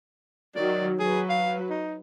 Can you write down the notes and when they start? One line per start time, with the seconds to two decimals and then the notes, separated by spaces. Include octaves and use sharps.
0.56 D#3 F#3 D5
0.99 F#3 G#4 B4
1.30 F5
1.70 D#4